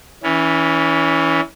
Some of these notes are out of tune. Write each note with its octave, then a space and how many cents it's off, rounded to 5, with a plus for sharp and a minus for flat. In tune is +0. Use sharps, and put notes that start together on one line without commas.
E3 -10 C#4 +25